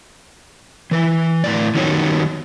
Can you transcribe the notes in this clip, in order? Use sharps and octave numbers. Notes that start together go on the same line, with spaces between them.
E3 B4
A2 D5
D#3 F#3 G3 B3 D#4 C#5